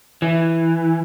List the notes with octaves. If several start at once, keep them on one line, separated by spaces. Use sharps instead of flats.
E3